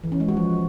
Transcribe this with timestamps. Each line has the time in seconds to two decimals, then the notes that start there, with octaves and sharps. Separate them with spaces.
0.04 E3
0.12 C#4
0.20 G#3
0.28 F#4
0.37 F3